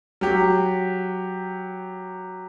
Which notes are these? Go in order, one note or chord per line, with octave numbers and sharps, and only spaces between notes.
F#3 G4